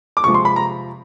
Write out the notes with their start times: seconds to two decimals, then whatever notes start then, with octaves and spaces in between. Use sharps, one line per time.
0.17 D6
0.24 C3 F3 G#3 C#6
0.34 C6
0.45 B5
0.56 A#5